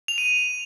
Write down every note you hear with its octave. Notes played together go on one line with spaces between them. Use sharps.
F7
D#7